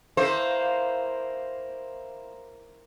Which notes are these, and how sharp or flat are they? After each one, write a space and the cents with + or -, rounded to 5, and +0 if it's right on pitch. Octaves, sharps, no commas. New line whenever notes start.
A#3 +0 E4 +0 C5 +0